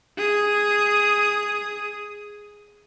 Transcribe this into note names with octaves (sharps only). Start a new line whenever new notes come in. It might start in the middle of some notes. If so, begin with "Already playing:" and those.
G#4 D#6